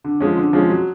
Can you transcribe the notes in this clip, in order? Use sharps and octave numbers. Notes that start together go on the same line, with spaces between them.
D3
F3 G#3 C#4
D3
F3 G#3 C#4
F#3